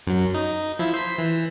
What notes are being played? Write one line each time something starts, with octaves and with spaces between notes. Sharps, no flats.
F#2 F#3
D#4
F3 E4
C5 B6
E3